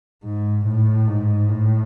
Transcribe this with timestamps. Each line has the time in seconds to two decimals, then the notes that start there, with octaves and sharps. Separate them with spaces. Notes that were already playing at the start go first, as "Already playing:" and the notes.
0.23 G#2
0.65 A2
1.07 G#2
1.49 A2